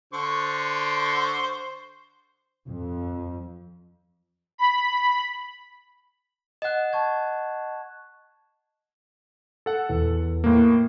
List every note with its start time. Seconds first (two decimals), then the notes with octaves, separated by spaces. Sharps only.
0.13 D3 C5 C#6
2.66 F2
4.58 B5
6.62 D#5 F#5 F#6 E7
6.93 A5 C#6 G#6
9.66 A4 F#5
9.89 E2
10.44 A2 A#3